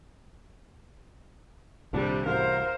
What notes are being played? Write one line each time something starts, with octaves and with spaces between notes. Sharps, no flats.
D#1 C2 C3 G3 D4
A1 F#4 A#4 C5 F5